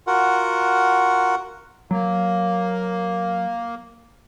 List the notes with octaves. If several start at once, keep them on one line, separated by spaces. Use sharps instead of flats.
F4 F#4 A#4 F#5
F#3 A#3